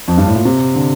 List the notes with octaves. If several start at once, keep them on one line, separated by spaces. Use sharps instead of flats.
F2
G2
A2
A#2
C3
D3